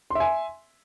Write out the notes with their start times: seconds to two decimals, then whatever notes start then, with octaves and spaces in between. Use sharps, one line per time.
0.10 C6
0.15 E5
0.20 G#5